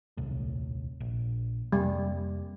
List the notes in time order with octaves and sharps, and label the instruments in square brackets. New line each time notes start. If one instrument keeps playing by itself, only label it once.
[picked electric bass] D#1 C2 A2
A#1
[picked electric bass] F2 C3 A#3 [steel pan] G3